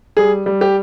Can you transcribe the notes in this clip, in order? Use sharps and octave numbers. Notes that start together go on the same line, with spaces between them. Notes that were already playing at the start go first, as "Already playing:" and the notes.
G3 G#4
G3
G4